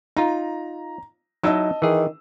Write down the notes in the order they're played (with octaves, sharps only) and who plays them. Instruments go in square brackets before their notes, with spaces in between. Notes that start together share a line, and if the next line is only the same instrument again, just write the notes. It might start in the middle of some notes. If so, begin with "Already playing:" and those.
[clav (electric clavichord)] D#4 F4 [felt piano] A#5
[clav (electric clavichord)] F#3 D#4 E4 [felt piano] D#5 A5 E6
[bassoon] D#3 [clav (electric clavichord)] E3 G#4